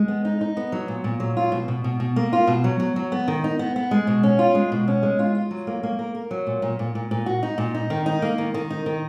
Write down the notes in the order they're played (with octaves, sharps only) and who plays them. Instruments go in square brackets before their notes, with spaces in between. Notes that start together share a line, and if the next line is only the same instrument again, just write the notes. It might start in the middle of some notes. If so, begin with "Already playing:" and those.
Already playing: [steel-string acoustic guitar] G#3
B3
D#4
D#4
B3
F#3
A#2
A#2
F#3
F4
B2
B2
B2
B2
A#3
F4
B2
F#3
F#3
F#3
B3
D#3
D#4
B3
B3
G#3
B2
C#4
F4
G#3
B2
C#4
G#3
F4
F4
F#3
A#3
A#3
A#4
A#4
F#3
A#2
A#2
A#2
A#2
A#2
F#4
D#4
A#2
D#4
D#3
D#4
A#3
D#3
D#3
D#4
D#3